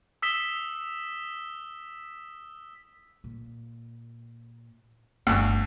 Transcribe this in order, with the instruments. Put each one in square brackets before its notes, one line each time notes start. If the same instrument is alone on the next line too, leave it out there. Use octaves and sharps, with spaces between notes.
[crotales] D#6 E6 B6 E7 G7
[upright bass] A#2
[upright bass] G1 F4 [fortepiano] D2 E6